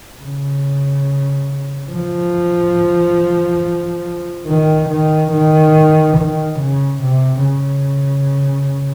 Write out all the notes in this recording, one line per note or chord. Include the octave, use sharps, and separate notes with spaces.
C#3
F3
D#3
D#3
D#3
D#3
C#3
C3
C#3